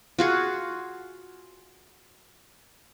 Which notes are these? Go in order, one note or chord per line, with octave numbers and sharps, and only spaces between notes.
F4 F#4 G#4